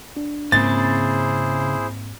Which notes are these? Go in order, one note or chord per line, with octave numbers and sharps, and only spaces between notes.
D4
G#2 C#3 A#3 C4 E4 G#4 C5 A6